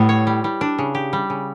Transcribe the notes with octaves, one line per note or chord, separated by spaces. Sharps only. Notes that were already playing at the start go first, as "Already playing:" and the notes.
Already playing: A2 G3 B3
C#5
G3
G3
D4
C#3
G4
G3
C#3